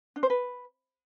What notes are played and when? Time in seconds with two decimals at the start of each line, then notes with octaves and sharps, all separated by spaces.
0.16 D4
0.23 C5
0.30 B4